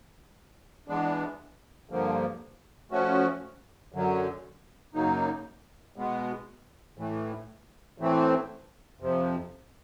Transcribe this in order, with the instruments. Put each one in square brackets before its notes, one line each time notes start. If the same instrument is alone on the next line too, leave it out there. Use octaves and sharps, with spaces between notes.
[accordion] E3 G#3 B3 D4
G2 D3 F3 A#3
F3 A3 C#4 F#4
F#2 D3 F#3
F#2 C#3 F#3 A#3 D#4
B2 G#3 B3
A2 E3 A3
A2 E3 A3 C4
F2 C3 F3